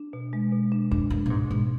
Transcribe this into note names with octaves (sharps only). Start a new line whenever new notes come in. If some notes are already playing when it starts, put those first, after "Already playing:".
Already playing: D4
B2
G#3
B2
D4
F2 D4
F#2 B2
A#2
G#2 B2
G#2 B2